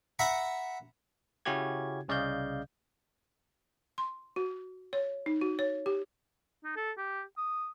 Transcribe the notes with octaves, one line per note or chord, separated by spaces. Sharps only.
E5 F#5 A#5 B5 C#6
C#3 C#4 E4 F#4 G4 G#6
C2 C#3 D5 D#5 F5 G6
C6
F#4
C#5
D#4
F#4
C#5
G4
D#4
A4
G4
D#6